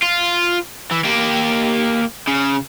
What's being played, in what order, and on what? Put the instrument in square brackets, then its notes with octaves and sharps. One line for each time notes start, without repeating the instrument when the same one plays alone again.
[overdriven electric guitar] F4
E3
A#3 G4
C#3